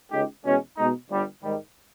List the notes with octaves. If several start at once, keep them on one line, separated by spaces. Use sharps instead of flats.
C#2 C#3 G#3 D#4 G4
E2 B2 G#3 C#4
B2 G#3 D#4
G1 G2 G3
G#2 D#3 G3